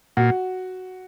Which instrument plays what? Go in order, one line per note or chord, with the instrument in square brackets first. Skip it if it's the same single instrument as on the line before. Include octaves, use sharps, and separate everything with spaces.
[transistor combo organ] A#2 [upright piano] F#4